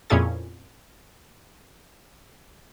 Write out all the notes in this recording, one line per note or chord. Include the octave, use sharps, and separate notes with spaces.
F2 A#2 C#4 E4 G#4 G#6